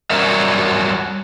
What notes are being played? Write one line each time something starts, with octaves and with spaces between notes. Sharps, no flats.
F#3 G3 A#4 E5